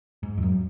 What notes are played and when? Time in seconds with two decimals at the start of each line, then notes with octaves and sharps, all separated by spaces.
0.23 G#2
0.38 F2
0.43 F#2